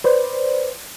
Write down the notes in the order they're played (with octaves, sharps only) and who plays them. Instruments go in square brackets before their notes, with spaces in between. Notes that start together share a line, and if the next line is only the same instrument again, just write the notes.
[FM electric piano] B4 C5 D5